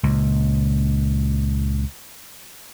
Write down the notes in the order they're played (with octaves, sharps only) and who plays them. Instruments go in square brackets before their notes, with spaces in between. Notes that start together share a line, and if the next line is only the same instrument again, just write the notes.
[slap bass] C#2 A#2